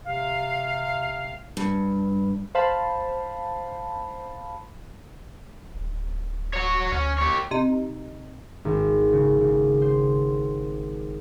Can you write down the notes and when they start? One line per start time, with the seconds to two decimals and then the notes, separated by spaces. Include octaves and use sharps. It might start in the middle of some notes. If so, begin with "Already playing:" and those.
0.05 C3 F5
1.57 G2
2.55 C5 F5 A5 B5
5.74 D1
6.53 F#4 C#5
6.92 D2 C#4
7.18 G4 C#5
7.51 C3 D#4
8.65 G#1
9.13 C#3
9.41 C#3
9.82 C5